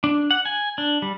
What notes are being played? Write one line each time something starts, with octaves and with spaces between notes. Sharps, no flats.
D4
F#5
G#5
D4
G3